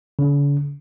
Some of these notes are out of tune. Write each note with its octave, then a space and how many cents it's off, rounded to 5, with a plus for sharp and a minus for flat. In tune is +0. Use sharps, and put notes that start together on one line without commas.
D3 -45